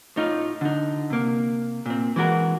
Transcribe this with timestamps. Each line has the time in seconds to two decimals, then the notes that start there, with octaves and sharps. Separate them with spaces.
0.16 A2 D#4 F4
0.61 D3 D#4
1.10 C3 A#3
1.86 A#2 C4
2.16 E3 G#3 F#4 A#4